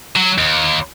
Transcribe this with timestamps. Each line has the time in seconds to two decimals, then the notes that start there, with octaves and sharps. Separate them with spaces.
0.16 F#3
0.38 D#2